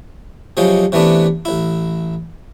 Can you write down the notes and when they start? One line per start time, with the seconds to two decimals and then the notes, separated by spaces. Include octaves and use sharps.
0.57 C3 F3 F#3 G#3 D#4
0.92 C3 E3 A3 B3 D4
1.45 A1 E4